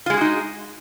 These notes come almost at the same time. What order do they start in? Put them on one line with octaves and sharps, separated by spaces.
F4 G#3 G#4 F#4 D#4